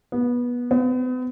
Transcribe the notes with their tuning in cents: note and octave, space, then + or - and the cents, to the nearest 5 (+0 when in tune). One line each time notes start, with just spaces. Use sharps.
B3 -20
B3 +40